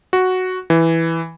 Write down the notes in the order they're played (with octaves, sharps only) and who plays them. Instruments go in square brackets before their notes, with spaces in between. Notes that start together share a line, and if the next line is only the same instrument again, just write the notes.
[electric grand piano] F#4
E3